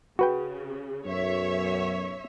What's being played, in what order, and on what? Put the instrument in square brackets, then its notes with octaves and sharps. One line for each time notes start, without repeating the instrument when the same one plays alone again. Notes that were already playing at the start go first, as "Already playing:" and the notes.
[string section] C#3 [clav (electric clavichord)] F#4 B4 G5
[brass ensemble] B1 F#2 [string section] C#5 E5